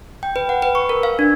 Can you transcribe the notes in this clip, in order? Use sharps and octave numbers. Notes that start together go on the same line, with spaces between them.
G5
B4
F#5
B4
C#6
A#4
F5
D4